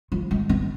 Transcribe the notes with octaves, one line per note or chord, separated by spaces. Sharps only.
F3
G#3
B3